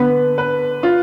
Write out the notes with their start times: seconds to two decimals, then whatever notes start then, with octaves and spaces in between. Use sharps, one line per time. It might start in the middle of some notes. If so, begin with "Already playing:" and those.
Already playing: D3 B3 B4
0.38 B4
0.83 F4